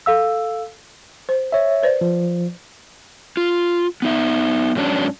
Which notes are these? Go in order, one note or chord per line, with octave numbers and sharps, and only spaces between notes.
A4 F5 E6
C5
C#5 E5
B4 C5 D5
F3
F4
B3 D#4 E5
G#2 F#3 C#4 D4